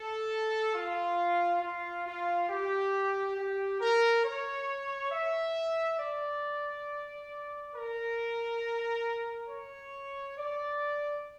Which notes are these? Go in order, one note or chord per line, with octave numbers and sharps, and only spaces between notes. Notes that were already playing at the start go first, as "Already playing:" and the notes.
Already playing: A4
F4
F4
F4
G4
G4
A#4
C#5
E5
D5
A#4
C#5
D5